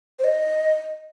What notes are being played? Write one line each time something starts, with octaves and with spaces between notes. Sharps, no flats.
C5
D#5